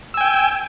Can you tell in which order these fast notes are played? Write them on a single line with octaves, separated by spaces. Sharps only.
E6 G#5 G5